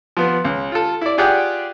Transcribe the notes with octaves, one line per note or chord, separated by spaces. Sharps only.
F3 B3
C#2
F4 A4
E4 D5
F4 G4 G#4 D5 F#5 G5